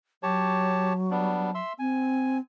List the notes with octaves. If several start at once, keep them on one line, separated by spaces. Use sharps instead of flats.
F#3 G4 C#5 A5
G3 B3 D4
E5 C6 E6
C4 G#5